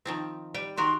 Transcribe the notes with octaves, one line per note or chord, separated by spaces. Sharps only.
D#3 F3 C4
G3 G5
D#3 F#4 A#4 C6